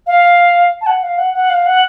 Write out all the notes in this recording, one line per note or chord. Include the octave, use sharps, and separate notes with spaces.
F5
A5
F#5
F5
F#5
F#5
F5
F#5